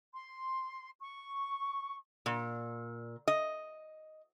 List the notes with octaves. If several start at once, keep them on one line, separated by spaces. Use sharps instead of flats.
C6
C#6
A#2
D#5